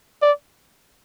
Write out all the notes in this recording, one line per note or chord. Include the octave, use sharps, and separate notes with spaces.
D5